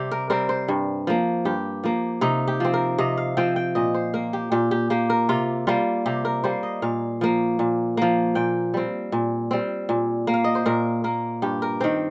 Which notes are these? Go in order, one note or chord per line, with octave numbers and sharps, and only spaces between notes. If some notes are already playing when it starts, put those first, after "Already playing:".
Already playing: C3 G3 G4
A#4
G3 C4 A#4
C5
G2
F3 A#3
G2 G4
F3 A#3
C3 D#4
G4
F3 C4
A#4
C3 D#5
F5
F3 C4 G5
G5
A#2 D#5
C5
A#3 A#4
G4
A#2 G4
G4
A#3 G4
A#4
C3 F4
G3 A#3 F4
C3 G4
A#4
G3 A#3 C5
D#5
A#2 F5
F3 A#3
A#2
F3 A#3
A#2 G5
G3 C4
A#2
G3 C4
A#2
A#3
F5
D#5
C5
A#2 A#4
A#3 A#4
G2 G4
A#4
D#3 C4 C5